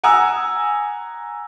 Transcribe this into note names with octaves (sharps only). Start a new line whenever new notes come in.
F#5 G#5 A#5 D#6 E6